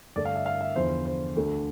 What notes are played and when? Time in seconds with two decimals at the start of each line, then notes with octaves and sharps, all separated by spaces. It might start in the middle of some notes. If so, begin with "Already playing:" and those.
0.16 G2 D3 A3 D5
0.25 F5
0.36 E5
0.46 F5
0.61 E5
0.76 E2 D3 F3 C5
1.06 C5
1.36 D2 D3 A3